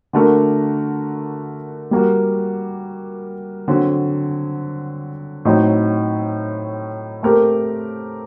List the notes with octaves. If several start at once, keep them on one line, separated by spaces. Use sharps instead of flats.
D3 A3 D4 F#4 A#4
G3 A#3 F#4
D3 F#3 C4
A2 F#3 C4 D#4
A3 C4 G4 A#4